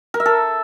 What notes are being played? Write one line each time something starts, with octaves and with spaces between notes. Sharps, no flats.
A#4
E5
A4